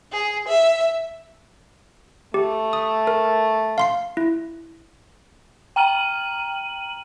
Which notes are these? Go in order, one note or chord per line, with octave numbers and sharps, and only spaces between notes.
G#4
E5
A3 G4
D#6
A#4
F5 C6 C7
E4
G5 A#5 F6 D#7 F#7